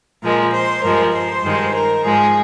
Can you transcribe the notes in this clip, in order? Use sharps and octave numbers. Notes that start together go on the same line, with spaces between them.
A#2 F3 G#3 A#4
C5
G2 F3 G#3 A#4
C5
G2 D#3 G#3
A#4
G#2 F3 G#3 G#4